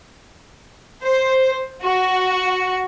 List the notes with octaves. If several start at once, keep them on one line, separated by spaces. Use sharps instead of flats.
C5
F#4